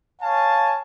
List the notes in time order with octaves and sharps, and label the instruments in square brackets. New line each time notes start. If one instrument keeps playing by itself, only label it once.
[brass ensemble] C#5 F5 G#5 A5